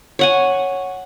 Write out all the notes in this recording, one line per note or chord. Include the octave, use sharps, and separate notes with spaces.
C#5 F#5 G#5